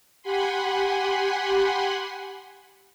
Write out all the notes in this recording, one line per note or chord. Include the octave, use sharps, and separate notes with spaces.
G4 F#5 G#5 B5 C6